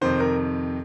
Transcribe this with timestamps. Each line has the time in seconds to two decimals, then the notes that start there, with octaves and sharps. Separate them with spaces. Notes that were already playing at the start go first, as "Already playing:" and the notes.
0.01 F2 C3 D#3 C5
0.20 A#4